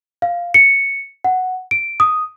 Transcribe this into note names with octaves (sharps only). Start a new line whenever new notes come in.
F5
C#7
F#5
D7
D#6